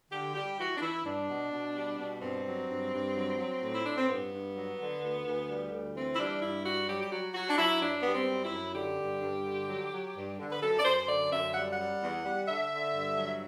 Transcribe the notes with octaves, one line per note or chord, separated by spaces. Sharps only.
D3 G4
G3 G4
E3 F#4
D4
E3 E4
G2 D4
B2
B2
G3
B2
G2 C4
F#3
G2
G2
F#3
F#3
A2
E4
A2 D4
C4
G2 B3
G2
F#3
D3
D2
D2
G3
D2
E3 C4
E4
G3 D4
G2 E4
G3 F#4
F#3 G4
G4
F#3 F#4
F#3 F#4
D4
F#3 E4
F#2 D4
G3 B3
C4
F#2
E4
F#2
D3 G4
G2
G2
D3
F#3
F#3
G2
D3
B4
F#2 A4
D5
F#2 C5
C5
D3 D5
F#2 E5
G3 F#5
F#5
G3
E2
G3
D3 E5
D3
G2
F#3